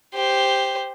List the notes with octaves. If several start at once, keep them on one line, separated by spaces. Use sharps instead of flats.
G4 C5